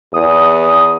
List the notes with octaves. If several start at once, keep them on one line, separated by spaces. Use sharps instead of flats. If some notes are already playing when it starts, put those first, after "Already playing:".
E2 D#6